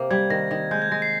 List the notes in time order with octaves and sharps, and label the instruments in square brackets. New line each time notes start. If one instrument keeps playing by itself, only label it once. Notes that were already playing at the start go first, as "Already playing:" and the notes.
Already playing: [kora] C3 A#3
[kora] G3 [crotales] G#6
[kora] D#3 [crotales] A#6
[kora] D#3
[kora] G#3 [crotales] G6
[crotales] G#6
[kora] G#3 [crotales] A#6
[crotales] C7